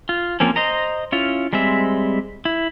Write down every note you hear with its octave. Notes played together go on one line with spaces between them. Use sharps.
F4
F3 A#3 C4 C#4
C5 D#5 A#5
C#4 E4 F4
G3 G#3 C4 E5
E4